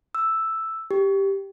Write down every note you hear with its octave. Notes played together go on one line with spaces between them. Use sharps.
E6
G4